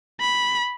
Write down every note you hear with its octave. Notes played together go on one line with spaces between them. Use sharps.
B5